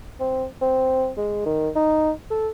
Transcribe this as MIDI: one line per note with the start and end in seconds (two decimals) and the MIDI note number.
0.20 0.45 60
0.62 1.10 60
1.17 1.42 56
1.46 1.69 51
1.75 2.11 63
2.31 2.49 69